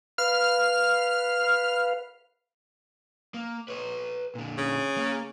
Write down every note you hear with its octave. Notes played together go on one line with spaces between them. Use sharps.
B4 F5 F6
A#3
B4 C#5
A#2 D3
C#3
A#3